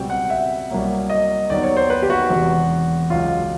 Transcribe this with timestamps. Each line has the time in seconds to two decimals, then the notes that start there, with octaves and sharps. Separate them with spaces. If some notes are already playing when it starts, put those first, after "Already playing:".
Already playing: C#2 B2 G3 C4 G5
0.10 F#5
0.30 E5
0.70 C2 B2 F#3 A#3
1.10 D#5
1.50 D#2 D#3 F#3 B3 D5
1.63 C#5
1.77 C5
1.90 B4
2.02 G4
2.10 F#4
2.30 E1 E2 C3
3.10 C#2 B2 F#3 F4